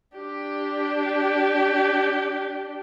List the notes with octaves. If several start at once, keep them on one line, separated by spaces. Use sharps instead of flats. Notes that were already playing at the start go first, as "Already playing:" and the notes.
D4 G4